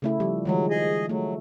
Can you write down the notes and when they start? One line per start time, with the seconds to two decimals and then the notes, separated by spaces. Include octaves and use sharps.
0.02 C#3 A3 E4
0.20 F3 G3
0.45 D#3 F3 F#3 G#3
0.70 G#4 D#5
1.09 F#3 A3